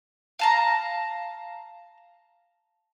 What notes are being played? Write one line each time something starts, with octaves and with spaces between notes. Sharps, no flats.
F5 A5 A#5